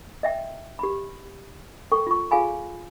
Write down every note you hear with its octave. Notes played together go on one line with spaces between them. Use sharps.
D#5 E5 G5
G4 B5
A4 G5 C#6
F4 C#6
F4 G#4 F5 G#5 B5